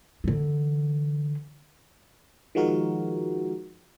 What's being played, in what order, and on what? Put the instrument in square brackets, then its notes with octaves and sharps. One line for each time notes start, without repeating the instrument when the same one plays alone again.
[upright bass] D3 E3
[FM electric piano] D#3 F3 G#3 F#4 A#4